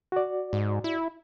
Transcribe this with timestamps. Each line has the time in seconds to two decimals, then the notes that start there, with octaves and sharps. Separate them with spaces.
0.12 F#4 D5
0.53 G#2
0.84 E4